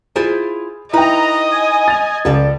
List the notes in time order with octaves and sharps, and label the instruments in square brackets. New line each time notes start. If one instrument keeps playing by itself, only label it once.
[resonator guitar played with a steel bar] E4 F4 C5 [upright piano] G#4
[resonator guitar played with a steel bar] D#4 B4 [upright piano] E4 G5 [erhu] D#5 [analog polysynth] A#5
[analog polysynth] G#5
[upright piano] A6 F7
[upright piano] C#2 [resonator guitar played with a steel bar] F3 A4 D5